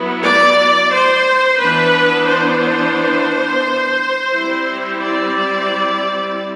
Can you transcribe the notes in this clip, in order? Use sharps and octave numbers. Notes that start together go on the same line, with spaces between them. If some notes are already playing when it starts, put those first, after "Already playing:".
Already playing: F#3 B3 E4
D5
C5
E3 B3 D4 B4
C5
G3 C4 E4
D5